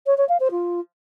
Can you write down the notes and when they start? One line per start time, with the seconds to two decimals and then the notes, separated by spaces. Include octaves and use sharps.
0.06 C#5
0.17 C#5
0.29 F5
0.40 C5
0.51 F4